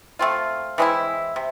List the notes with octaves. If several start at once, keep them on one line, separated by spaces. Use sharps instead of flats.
A3 C4 F4
E3 G#3 C4 E4
C3